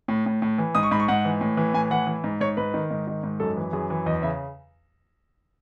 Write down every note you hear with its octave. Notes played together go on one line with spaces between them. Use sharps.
A2
A2
A2
E3
G#2 D#6
C#6
G#2 B5
C#6
G#2 F#5
E3
A2
E3
A2 G#5
E3 F#5
E3
G#2
G#2 C#5
G#2 B4
D#3
G#2
D#3
G#2
F#2 A4
E3
F#2 G#4
E3
E2 D#5
C#3 E5